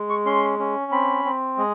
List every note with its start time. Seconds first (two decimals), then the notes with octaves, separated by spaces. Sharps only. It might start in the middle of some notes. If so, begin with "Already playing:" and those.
Already playing: G#3
0.10 C#6
0.26 C#4 C6
0.59 C#4
0.92 C4 B5
1.25 C4
1.58 G#3